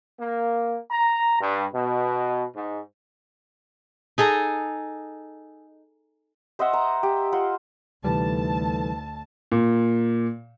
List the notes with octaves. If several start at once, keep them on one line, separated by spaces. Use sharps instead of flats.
A#3
A#5
G2
B2
G#2
D#4 G#4 A4 D#5
C5 D#5 E5 F#5
A#5
G4
F4 C5 F#5
D2 C3 E3 G3 D#4 A4 B4 A5
A#2